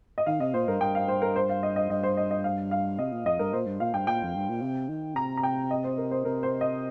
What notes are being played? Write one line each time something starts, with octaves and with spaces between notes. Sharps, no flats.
D#5
D#3 F5
C3 D#5
A#2 C5
G2 A#4
G2 G5
F5
C5
A#4
C5
F5
D#5
D#5
G2 D#5
C5
D#5
D#5
F5
F5
C3 D#5
A#2
F2 D#5
G2 A#4
A#2 C5
G2
A#2 F5
G2 G5
A#2 G5
F2
G2
A#2
C3
D#3
C3 A#5
A#5
G5
D#5
C5
A#4
C5
C3 A#4
C5
D#5